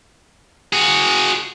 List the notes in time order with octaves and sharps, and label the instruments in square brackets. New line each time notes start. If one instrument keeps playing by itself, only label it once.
[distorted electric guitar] F#4 G#4